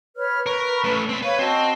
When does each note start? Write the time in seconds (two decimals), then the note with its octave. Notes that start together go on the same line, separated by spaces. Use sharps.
0.16 B4 C#5 F6
0.46 A#4 B4 C#6
0.84 A3 C#4
1.09 C4 B5
1.23 B4 C#5 F5 C#6
1.39 C4 F#4 D#5 A5